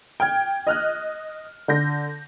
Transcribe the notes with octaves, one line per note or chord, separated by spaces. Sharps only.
G5 F6 G#6
D#5 F6 F#6
D3 G6 A#6